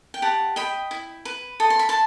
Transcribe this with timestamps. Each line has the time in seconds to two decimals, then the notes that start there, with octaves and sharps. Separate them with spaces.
0.14 G5
0.22 G4 F#5 A5
0.56 D#5 G5 B5
0.91 E4
1.25 B4
1.60 A4 D#6
1.70 C6
1.79 B5
1.89 A5 C6